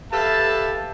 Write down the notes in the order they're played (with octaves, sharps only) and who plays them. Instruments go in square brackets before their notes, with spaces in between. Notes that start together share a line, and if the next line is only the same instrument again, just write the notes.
[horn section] G4 A4 B4 E5 F5 A5